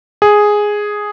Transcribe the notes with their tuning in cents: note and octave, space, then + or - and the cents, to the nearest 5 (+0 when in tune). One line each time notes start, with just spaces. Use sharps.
G#4 +0